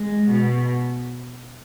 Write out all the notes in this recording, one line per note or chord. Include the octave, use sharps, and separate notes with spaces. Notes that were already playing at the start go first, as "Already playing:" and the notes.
Already playing: G#3
B2